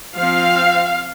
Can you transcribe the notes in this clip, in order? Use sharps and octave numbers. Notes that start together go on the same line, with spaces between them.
F3 C4 F5